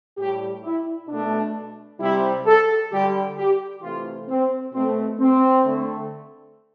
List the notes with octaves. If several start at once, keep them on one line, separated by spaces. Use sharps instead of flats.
A2 G3 G4
E4
B2 A3 D4
C3 G3 E4
A4
D3 G3 G4
G4
C3 E3 A3 F4
C4
B2 A3 C4
C4
D3 A3